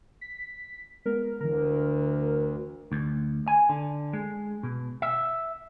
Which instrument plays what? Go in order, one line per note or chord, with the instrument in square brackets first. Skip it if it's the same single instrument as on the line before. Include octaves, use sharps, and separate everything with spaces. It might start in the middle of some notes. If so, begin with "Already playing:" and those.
[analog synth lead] B6
[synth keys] G#3 B3 [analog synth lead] A#4
[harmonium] D2 [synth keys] D3 E3 [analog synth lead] A#4
[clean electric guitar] D2
G#5
D3
G#3
B2
E5